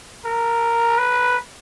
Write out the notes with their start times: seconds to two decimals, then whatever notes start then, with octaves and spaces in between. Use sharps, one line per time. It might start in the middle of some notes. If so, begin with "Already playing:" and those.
0.25 A#4
0.98 B4